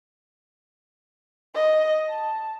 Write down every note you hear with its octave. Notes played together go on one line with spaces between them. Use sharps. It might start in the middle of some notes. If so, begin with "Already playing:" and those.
D#5
A5